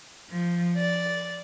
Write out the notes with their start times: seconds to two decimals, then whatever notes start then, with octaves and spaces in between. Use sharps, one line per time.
0.30 F3
0.79 D5